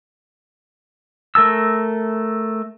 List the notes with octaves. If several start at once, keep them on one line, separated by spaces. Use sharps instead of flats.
A3 A#4 A5 E6